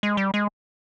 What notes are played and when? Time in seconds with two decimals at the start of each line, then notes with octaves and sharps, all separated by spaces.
0.03 G#3
0.17 G3
0.34 G#3